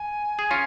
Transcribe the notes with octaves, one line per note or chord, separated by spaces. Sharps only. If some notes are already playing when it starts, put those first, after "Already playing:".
Already playing: G#5
G#4
C#4 F4